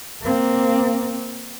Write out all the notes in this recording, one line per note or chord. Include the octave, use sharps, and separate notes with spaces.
A#3 C4